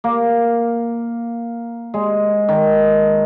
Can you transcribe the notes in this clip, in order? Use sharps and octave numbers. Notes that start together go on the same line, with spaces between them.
A#3
G#3
D#3